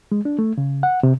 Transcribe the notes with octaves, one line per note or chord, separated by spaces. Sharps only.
G#3
D4
A3
C#3
F#5
C3